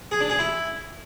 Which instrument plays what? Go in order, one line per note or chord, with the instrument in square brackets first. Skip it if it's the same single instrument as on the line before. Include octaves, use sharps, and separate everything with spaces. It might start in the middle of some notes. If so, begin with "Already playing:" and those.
[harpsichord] G#4
D4
G#4
E4